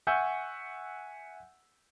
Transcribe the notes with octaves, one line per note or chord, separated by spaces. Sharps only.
E5 F#5 G#5 C#6 E6 G6